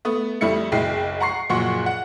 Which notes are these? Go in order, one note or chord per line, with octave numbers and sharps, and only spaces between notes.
A3 B3 D#6
F2 G3 A3 E4 C#7
F#1 B1 G#3 E4 G5 C7
F#5 A#5 C#6 C7
F#1 A#2 F3 F#3 F#5 C#6
F#5